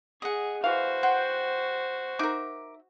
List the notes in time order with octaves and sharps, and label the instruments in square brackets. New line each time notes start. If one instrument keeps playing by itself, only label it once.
[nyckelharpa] G#4 [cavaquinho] D#5 F#5
[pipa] E3 F5 [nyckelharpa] F#4 C5
[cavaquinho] F#5 G5 C6
[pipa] D#4 E5 [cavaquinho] A#4 D6